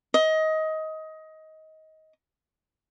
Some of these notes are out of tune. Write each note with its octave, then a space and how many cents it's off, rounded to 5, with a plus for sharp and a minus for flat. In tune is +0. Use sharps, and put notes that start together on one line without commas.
D#5 +20